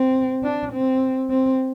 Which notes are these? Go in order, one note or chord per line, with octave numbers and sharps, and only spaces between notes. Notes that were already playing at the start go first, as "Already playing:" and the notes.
Already playing: C4
D4
C4
C4